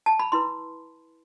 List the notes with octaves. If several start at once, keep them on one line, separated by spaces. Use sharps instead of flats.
A5
B5
E4 B4 C6